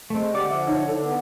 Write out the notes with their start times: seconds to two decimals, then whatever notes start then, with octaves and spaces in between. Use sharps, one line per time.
0.10 G#3 A3 C4
0.34 D3 G4 D5 F#5 D6
0.49 F3 E5
0.67 D#4 C#5 D#5 E5
0.87 D3 E4 A4
1.00 B3